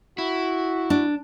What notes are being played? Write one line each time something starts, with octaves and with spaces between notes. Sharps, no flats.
E4 F#4
D4